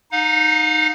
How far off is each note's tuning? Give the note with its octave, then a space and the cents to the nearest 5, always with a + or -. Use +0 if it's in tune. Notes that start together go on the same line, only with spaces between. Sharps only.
D#4 -5 F5 +40